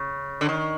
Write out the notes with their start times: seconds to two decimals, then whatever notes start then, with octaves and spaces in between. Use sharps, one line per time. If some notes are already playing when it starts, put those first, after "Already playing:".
Already playing: C#3
0.41 D3
0.49 D#3